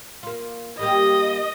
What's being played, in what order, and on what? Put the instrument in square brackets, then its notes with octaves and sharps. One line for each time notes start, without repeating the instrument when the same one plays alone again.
[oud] A#3 F4
[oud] G3 A#3 G4 [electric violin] D#5